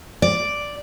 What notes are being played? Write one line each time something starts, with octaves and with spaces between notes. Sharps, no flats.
D5